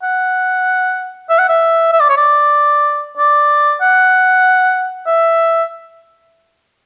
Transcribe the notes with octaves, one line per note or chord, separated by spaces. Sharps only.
F#5
E5
F#5
E5
E5
D5
C#5
D5
D5
F#5
E5